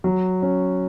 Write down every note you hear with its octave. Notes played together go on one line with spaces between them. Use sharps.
F#3
C#4